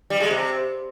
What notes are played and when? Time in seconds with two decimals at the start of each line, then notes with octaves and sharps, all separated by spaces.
0.10 G3
0.20 G#3
0.31 C3